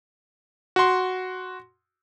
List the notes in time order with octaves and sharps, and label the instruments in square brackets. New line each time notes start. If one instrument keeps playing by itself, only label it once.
[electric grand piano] F#4 C6